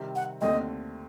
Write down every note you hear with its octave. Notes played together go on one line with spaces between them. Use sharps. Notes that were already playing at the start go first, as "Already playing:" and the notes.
Already playing: C3 D#3 G3 C4
F#5
D#2 D3 A3 C4 D#5